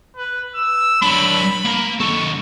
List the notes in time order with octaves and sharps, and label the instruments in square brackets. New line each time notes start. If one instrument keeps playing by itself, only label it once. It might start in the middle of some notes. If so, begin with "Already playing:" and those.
[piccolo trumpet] B4
E6
[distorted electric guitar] F#3 D4 [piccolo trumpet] B5
[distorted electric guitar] A#3 A#5
[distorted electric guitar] D#3 A4 [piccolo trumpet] C#6